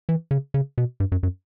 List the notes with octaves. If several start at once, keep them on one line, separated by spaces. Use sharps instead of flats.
E3
C#3
C#3
B2
G2
F#2
F#2